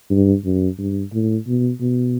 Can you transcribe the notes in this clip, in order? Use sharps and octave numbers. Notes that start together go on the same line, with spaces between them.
G2
F#2
G2
A2
B2
B2